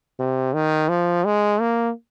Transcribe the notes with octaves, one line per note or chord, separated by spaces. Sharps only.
C3
D#3
F3
G#3
A#3